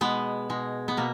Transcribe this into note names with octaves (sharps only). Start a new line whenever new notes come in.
B2 G#3 B3
B2 G#3
B3
B2 A#3